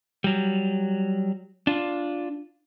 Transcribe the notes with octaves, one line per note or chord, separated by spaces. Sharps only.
F#3 G3
D4 F4